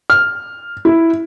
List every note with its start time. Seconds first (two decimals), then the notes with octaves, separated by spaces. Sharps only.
0.10 F6
0.85 E4